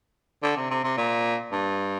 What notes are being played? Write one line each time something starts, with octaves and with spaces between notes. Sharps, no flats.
D3
C3
C3
C3
A#2
G2